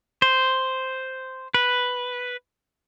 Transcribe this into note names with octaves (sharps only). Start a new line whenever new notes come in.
C5
B4